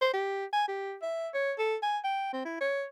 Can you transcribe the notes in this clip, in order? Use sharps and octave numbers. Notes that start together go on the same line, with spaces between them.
C5
G4
G#5
G4
E5
C#5
A4
G#5
G5
C4
E4
C#5